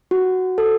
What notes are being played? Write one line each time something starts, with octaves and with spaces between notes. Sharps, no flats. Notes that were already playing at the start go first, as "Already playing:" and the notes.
F#4
A4